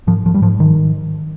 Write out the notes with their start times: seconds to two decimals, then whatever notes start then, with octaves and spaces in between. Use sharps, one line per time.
0.07 G#2 F3
0.25 G#2 F3
0.34 G3
0.42 G#2 F3
0.60 G#2 D#3